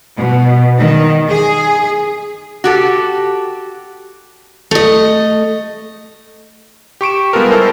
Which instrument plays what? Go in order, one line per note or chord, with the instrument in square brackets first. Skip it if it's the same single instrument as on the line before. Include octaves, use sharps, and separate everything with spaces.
[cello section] B2
D#3
G#4
[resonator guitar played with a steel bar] F#4 G4 A4
[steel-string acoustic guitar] A3 D#5
[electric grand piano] G4 C#6 D7 E7
G3 G#3 B3 F4 A4 A#4
E4 A4 A#4 C5